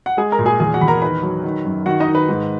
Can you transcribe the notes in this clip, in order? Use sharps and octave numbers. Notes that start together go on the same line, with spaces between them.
F#5
G#3 G#4 G#5
A#4 A#5
A#2
G#4 G#5
E2 G#4 G#5
F#4 F#5
E2 B5
A#4 A#5
D#3 B4 B5
F#3
D#3
F#2
D#3 F#4 F#5
D#4 D#5
D#3
B4
G#2